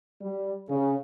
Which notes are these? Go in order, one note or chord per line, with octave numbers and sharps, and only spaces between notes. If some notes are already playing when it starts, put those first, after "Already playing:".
G3
C#3